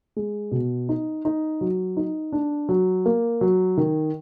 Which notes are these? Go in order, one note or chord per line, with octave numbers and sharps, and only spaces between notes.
G#3
B2
D#4
D#4
F#3
D#4
D4
F#3
A#3
F#3
D#3